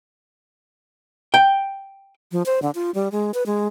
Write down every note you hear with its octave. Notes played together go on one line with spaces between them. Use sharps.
G5
F3
C5
D3
F4
G3
G#3
B4
G#3